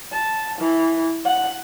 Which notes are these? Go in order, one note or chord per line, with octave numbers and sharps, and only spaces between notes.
A5
E3
F#5